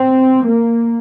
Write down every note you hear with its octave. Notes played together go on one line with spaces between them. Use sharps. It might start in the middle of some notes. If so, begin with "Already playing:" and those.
Already playing: C4
A#3